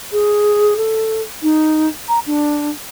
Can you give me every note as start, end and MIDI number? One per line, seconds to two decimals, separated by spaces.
0.12 0.74 68
0.77 1.22 69
1.42 1.88 63
2.08 2.19 82
2.26 2.70 62